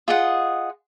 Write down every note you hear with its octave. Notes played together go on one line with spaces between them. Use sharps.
F4 G#4 D#5 F#5